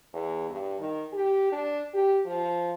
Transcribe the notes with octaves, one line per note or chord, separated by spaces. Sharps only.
E2
G2
D#3
G4
D4
G4
F3